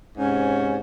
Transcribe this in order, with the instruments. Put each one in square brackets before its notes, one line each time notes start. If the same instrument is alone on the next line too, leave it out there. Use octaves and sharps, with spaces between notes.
[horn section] G#2 C3 C#4